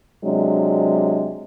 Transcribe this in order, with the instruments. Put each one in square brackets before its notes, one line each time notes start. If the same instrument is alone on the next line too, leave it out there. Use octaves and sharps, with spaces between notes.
[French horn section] C3 F#3 G#3 D4